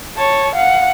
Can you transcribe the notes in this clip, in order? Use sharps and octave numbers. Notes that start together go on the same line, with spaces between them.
C#5 A5
F5 F#5